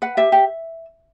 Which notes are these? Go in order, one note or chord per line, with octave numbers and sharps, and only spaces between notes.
B4 F#5
G4 E5
G4